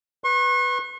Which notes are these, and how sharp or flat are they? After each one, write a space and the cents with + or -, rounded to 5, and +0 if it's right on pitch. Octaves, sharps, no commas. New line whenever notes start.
B4 +0 C#6 -45